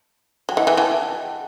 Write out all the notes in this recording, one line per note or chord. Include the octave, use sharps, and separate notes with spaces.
F#3 G5
E3 D#5 F#5
E3 E5 G5
E3 F#5 A5